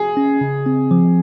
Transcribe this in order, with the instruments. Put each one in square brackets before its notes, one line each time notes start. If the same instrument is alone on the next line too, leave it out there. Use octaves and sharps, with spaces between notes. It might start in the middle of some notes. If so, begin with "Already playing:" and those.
Already playing: [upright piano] G#4
[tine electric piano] C#4
C#3
C4
F3